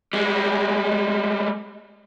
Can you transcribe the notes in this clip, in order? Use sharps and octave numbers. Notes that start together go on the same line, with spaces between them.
G3 G#3